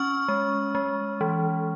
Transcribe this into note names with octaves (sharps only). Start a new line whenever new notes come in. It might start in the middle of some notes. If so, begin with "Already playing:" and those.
Already playing: C#4 C#6 F6
G#3
G#3
E3